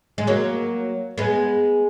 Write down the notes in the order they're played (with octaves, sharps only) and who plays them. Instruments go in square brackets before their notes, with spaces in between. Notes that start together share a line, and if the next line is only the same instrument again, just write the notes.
[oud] G#3
F#3 A#3
G#3 B3